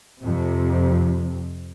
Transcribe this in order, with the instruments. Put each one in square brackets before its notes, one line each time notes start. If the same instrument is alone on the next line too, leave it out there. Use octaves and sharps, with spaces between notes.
[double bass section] F2 C3